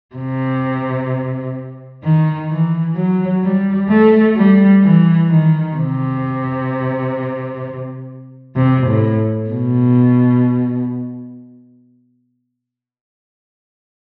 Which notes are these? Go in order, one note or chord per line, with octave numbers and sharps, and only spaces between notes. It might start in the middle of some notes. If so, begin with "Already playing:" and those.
C3
D#3
E3
F#3
G3
A3
G3
E3
D#3
C3
C3
A2
B2